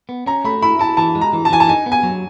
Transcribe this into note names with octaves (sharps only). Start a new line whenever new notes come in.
B3
C#4 A#5
A3 B5
E4 B5
E4 A5
E3 A5
G#3
A#5
E3
A5
E3 G#5
A5
D#4 G#5
B3
G#5
F#3